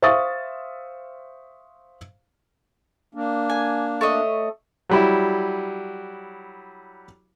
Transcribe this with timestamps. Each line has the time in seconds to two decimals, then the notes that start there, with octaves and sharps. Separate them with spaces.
0.02 C5 E5 F5 C#6 D#6 A6
3.15 A#3 D4
3.50 G#5
4.01 A3 C#5 D#5
4.90 F#3 G3 E4